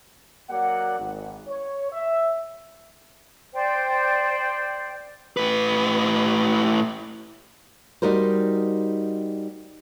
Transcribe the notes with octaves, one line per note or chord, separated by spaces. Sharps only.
F#3 A#3 D5 F#5
G#1
C#5
E5
C5 D5 G5
A2 B4
G3 D#4 F#4 A#4 C5